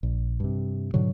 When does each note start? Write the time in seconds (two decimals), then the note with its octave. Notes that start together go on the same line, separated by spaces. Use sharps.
0.03 A#1
0.40 G2 C3
0.94 G#2 B2 D3 F#3